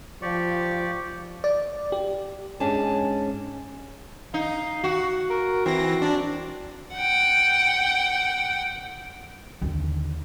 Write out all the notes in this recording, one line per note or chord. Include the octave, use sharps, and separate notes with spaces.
F3 G4 D5 C#6
D5
G4
G#2 C#4 D4 G#5 A5
D#4 F5
F#4
A#4
E3 C4 A#6
D4
F#5 G5
D#2 D3